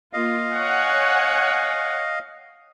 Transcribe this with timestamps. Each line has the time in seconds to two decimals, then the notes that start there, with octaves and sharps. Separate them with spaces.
0.13 A#3 F4 D#5 F5
0.53 C#5 F#5 G#5